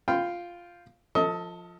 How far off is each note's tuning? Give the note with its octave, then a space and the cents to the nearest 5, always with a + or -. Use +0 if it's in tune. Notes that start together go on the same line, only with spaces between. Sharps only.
F4 +0 G5 +0 B5 +25
F3 +0 A4 +20 D#5 +30